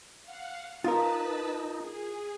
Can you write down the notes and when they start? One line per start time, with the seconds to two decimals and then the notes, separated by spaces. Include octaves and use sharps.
0.23 F5 F#5
0.84 D#4 F4 A#4 B4 A5 B6
1.79 G#4